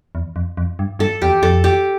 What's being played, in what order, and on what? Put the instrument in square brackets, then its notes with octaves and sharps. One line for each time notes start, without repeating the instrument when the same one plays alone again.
[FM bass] E2
F2
F2
G2
[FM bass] G2 [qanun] A4
[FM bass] E2 [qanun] G4
[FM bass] F2 [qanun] A4
[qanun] G4